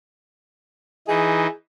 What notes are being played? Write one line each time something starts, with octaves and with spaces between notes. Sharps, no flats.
E3 D#4 G#4